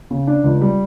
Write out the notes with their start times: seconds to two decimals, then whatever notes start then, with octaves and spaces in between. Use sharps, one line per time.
0.11 C#3
0.27 D4
0.44 C#2
0.61 G3